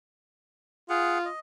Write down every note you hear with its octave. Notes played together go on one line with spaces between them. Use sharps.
F4 G#4 F#5
D#5